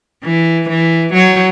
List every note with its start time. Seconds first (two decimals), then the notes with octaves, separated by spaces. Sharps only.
0.24 E3
0.69 E3
1.13 F#3